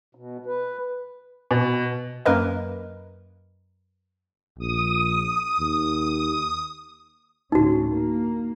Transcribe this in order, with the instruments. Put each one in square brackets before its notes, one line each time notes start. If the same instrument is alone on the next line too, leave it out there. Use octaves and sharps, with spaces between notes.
[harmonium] B2
B4
[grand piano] B2
[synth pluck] F#2 A#3 A#4 B4 D#5
[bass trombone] A#1 [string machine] D#6
[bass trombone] D#2
[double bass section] D2 A2 C#4 [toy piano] D#4 F#4
[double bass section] A#3